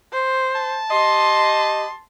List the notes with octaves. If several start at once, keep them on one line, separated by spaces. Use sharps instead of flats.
C5
A5
G4 D#5 C6